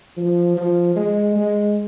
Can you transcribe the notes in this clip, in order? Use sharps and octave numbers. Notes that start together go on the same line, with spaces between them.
F3
F3
G#3
G#3